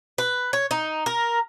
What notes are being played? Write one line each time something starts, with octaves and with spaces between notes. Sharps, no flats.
B4
C#5
D#4
A#4